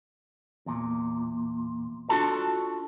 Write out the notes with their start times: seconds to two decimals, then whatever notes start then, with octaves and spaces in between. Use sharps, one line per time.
0.66 E2 A#2
2.09 D4 F4 F#4 A4 A5